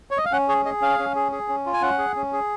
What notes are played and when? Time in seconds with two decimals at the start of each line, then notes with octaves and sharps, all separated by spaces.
0.11 C#5
0.18 D#5
0.25 F5
0.32 C#4 F#5
0.48 G#4 C#5
0.65 G#4 D#5
0.82 C#4 F5
0.99 C#4
1.15 G#4
1.32 G#4
1.48 C#4
1.66 F4
1.73 G#5
1.82 C#4 F#5
1.98 G#4
2.16 C#4
2.33 G#4